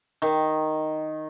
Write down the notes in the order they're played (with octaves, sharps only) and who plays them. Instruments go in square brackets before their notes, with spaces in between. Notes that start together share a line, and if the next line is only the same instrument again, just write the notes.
[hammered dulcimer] D#3